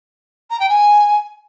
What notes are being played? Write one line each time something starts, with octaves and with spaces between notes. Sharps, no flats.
A#5
G5
G#5